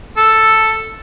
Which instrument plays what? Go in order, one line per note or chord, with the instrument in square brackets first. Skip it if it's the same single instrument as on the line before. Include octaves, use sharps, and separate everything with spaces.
[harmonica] A4